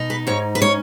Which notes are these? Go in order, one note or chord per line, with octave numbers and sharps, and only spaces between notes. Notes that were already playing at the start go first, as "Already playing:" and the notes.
Already playing: B2 D#4
B4
G#2 C#5
B4
C#4 C#5